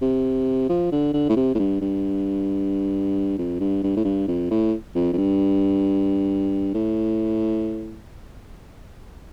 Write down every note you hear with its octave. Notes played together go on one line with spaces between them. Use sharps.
C3
F3
D3
D3
A2
C3
A2
G2
G2
F2
G2
G2
A2
G2
F2
A2
F2
F2
G2
A2